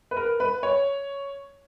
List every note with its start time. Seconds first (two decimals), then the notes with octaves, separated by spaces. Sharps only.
0.11 B4
0.17 A#4
0.40 B4
0.63 C#5